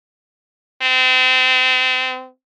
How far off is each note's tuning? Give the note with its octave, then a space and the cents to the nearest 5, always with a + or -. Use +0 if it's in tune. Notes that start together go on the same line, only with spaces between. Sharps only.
C4 -30